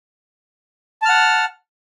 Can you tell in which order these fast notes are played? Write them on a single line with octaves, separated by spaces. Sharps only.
A5 F6 F#5